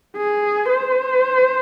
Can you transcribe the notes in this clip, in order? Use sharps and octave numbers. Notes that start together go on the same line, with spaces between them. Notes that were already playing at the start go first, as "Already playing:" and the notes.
G#4
C5